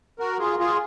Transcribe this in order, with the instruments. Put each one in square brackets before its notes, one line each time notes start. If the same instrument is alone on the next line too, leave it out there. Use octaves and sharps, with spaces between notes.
[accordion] F#4 A#4
F4 G#4
F4 G#4